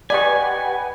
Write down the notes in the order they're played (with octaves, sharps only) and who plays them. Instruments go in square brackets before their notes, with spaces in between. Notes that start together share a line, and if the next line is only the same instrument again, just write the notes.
[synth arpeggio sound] G4 B4 B5 [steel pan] D5 D#5 C#6 [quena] F#5 [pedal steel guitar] G#5